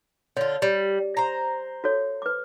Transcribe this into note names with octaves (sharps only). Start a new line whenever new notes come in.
D3 F4 C#5
G3
C5 A#5
F#4 A4 C#5
B4 D6